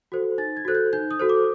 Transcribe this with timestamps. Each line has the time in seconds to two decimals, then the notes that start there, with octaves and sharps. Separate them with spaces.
0.12 F#4 A4 C5
0.38 D#4 A6
0.57 G#6
0.65 F#4 A4 C5 F#6
0.75 G6
0.93 D#4 G6
1.11 D#6
1.19 F#4 A4 C5
1.29 D6